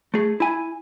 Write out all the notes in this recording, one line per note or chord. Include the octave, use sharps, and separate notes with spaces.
A3 G#4
E4 G#5